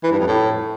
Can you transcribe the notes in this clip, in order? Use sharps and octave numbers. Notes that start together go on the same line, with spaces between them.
E3
G2
F2
A2